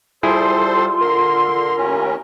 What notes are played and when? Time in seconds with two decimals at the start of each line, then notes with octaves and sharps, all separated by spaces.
0.23 G3 E4 F4 G#4 A4 C5 C6
1.01 D3 A#4 C6
1.77 D#2 A2 C#4